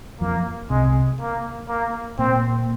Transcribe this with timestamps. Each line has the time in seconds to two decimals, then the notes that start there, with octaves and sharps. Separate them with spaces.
0.21 F2 F3 A#3
0.70 C2 C3 G#3
1.20 A#3
1.69 A#3
2.19 A#2 A#3 C4